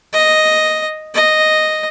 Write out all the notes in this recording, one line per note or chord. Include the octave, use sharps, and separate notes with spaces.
D#5
D#5